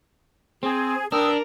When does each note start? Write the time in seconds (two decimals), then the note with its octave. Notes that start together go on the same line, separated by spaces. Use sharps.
0.63 C4 G#4
1.12 D4 A#4 G5 D#6 E6